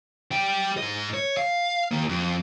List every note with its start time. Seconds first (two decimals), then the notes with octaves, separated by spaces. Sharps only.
0.32 G3 G5
0.77 G#2 D#5
1.14 C#5
1.37 F5
1.91 D#3 A#3
2.09 F2